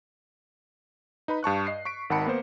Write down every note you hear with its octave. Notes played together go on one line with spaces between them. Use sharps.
D#4 B4 B5
G2 A5 C#6 F#6
D#5 C7
C#6 B6 D7
G#1 D#3 F#5 A5 B5 C#7
A#3 B3 C5